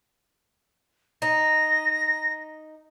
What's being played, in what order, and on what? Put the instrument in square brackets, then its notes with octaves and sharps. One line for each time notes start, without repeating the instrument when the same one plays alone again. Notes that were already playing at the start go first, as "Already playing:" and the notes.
[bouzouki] D#4 [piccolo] A#6